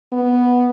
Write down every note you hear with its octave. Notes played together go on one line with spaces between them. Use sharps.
B3